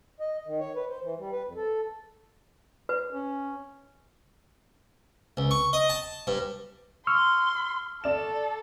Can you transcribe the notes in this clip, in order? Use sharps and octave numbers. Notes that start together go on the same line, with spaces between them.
D#5
D#3
C#5
B4
C5
E3
G3
B4
F2
A4
B4
C#4
C#2
C#6
D#5
A5
G2
C6 C#6 E6 F6
A4 D5 E7